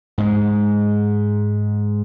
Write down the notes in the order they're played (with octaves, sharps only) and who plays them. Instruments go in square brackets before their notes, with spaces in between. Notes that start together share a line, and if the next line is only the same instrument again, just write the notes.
[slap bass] G#2 G#3